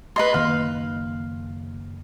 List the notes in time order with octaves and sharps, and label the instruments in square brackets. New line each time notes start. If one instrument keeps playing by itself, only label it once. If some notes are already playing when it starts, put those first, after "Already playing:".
[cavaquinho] B4 D#5 C6
[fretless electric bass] F#1 D#3 A#3 [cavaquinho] F5